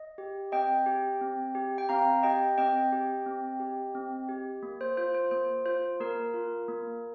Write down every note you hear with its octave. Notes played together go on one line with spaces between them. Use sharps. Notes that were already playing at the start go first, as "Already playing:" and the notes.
Already playing: D#5
G4
C4 D#5 G5
G4
C4
G4
G5
C4 F5 A#5
G4 D#5 G5
C4 D#5 G5
G4
C4
G4
C4
G4
A#3
C5
F4 C5
C5
A#3 C5
F4 C5
A#3 A#4
F4
A#3